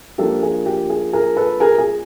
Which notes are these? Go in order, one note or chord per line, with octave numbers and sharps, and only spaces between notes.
F3 A#3 D4 F4 G4 A4
G#4
G4
G#4
G#4 A#4
A4 B4
G#4 A#4
G#4